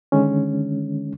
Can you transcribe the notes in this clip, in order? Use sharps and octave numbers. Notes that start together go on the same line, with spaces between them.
D3 D#3 G#3 C#4